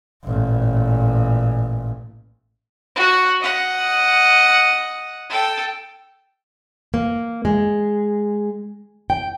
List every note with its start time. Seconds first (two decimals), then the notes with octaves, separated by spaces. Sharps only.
0.24 A1 A#2
2.96 F#4 F#5
3.41 D#5 F#5
5.30 A4 G5
6.94 A#3
7.45 G#3
9.10 G5